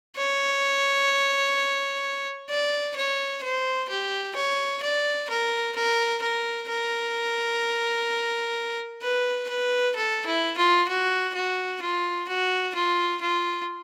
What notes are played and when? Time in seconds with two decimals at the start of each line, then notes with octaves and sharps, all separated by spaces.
0.17 C#5
2.49 D5
2.96 C#5
3.43 C5
3.89 G4
4.36 C#5
4.82 D5
5.30 A#4
5.76 A#4
6.22 A#4
6.69 A#4
9.02 B4
9.49 B4
9.96 A4
10.26 E4
10.57 F4
10.88 F#4
11.35 F#4
11.82 F4
12.28 F#4
12.75 F4
13.21 F4